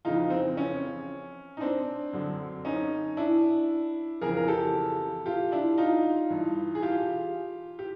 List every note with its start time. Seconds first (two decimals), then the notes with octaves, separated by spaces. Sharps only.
0.05 F2 C#3 E3 D#4 F4
0.30 C4
0.57 C#4
1.57 D#4
1.61 C4 D4
2.13 F#2 D3 F#3
2.65 C#4 D#4
3.17 D4 E4
4.21 F2 C#3 E3 G#4 A#4
4.36 A#4
4.48 G4 A4
5.26 F4 G4
5.52 D4 E4
5.78 D#4 F4
6.30 G2 E3
6.75 G#4
6.83 F4 G4
7.79 G4